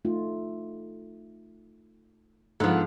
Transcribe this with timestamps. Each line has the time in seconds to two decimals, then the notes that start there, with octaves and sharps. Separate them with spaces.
0.05 A3 D#4 F4
2.60 G#2 D3 F3 B3